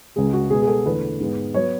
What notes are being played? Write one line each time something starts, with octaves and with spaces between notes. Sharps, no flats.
C#2 C#3 G#3 G#4
F#4
B2 G#3 B3 G#4
G#4
A4
E2 D3 A3 B4
G#2 G#3 B3
F#3 B3 C#5